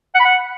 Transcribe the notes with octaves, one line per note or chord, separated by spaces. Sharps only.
F#5
B5
F#5